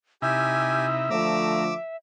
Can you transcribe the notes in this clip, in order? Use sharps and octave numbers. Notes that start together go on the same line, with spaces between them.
C3 D#4 E4 G4 E5 G#5
D3 F3 A3 A#5 D6 E6